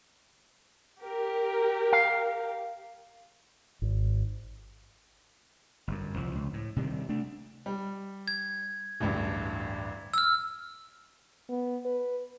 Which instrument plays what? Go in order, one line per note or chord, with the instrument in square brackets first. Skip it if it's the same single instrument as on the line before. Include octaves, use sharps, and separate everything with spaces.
[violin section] G4 A#4
[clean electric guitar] F5
[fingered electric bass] G#1
[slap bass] G1 F#2
C2 F3
C#2
A2
C3 D#3 G3
A3 D4
[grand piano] G3
[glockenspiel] G#6
[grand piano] D1 A1 G2
[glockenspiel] E6 F6
[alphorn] B3
B4